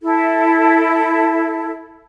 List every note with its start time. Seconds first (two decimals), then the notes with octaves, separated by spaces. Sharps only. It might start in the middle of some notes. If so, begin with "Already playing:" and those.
0.01 E4 A4